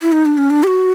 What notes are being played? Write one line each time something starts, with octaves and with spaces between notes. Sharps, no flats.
E4
D#4
D4
C#4
D4
G4
F#4